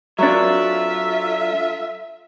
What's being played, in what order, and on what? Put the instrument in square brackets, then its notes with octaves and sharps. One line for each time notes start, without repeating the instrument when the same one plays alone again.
[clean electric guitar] F#3 D4 [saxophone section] F4 A4 E5